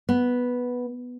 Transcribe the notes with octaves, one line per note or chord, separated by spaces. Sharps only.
B3